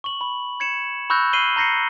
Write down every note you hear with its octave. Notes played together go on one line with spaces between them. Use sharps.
C#6 F#7
B5
G#6 C#7 E7
B5 C#6 E6 F#6 G6 A#6
F6 C7 D#7 F#7 G7
A#5 G6 A#6 C7 C#7